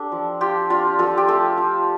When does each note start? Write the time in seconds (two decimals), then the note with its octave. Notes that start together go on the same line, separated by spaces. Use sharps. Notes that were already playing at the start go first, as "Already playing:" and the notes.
Already playing: D4 G4 A4
0.12 F3
0.41 F4 G4
0.70 D4 F4
0.99 F3 F4 A4
1.17 G4
1.28 A3 F4 A4
1.58 F4